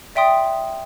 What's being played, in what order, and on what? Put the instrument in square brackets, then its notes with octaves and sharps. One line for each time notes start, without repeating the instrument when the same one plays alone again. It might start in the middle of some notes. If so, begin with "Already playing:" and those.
[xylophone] D5 E5 G5 C6 D#6